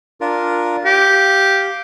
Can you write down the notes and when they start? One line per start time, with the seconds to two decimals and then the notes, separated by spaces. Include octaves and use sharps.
0.21 D4 F4 A#4
0.85 G4 F5